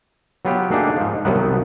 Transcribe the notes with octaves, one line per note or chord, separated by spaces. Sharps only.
F#3 B3 F4 G4 B4
A3 A#3 D4 D#4 G4 G#4
G#2 F3
C2 D#3 F3 F#3 B3 B4